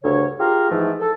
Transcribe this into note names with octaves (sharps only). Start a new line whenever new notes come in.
D2 G2 C#3 C#5
F4 G4 G#4 A#4 F5
G#2 E3 F3 A3 E4
A4